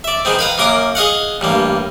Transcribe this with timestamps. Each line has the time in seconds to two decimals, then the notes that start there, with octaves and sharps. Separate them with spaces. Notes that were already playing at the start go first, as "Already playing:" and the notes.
0.04 D5 E5
0.25 D#3 G#3 B3 C4
0.39 B4 F5 A#5
0.58 F#2 A#3 A#4 D6 D#6
0.95 G#4 D#5 F5 F#5
1.41 A1 G2 A#3